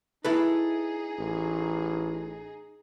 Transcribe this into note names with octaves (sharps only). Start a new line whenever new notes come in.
D#4 E4 G#4 A4 B4
A1